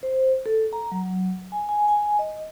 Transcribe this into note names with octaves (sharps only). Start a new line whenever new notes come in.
C5
A4
A#5
F#3
G#5
G#5
G#5
D#5